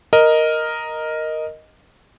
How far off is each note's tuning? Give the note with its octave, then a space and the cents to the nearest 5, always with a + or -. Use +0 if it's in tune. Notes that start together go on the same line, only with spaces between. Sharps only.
A#4 +0 D#5 +0